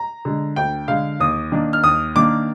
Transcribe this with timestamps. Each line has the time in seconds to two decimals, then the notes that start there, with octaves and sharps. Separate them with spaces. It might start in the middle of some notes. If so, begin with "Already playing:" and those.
Already playing: A#5
0.25 D3 G#3
0.56 D2 G5
0.88 D3 G#3 F5
1.20 D#2 D#6
1.52 D#3 A#3 D4
1.73 F6
1.83 D#2 D#6
2.16 D#3 A#3 D4 D6